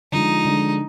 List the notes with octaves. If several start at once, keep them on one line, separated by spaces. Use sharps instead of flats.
D3 F3 G#3 D#4
D3 F3 G#3